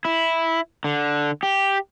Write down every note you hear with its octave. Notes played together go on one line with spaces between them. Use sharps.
E4
D3
G4